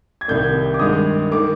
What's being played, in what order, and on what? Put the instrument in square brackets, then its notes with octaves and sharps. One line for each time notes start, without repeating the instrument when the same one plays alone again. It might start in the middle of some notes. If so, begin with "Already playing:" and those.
[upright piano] G#6
C2 C3 D#3 G3 A#3 G6
D6
G2 D#3 G#3 D#6
D#3 A#3 D6